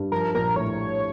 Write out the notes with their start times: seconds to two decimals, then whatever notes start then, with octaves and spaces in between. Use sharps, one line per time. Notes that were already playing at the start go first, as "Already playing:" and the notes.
Already playing: G2
0.12 F3 A#4
0.35 A#1 A#4
0.56 A2 C#5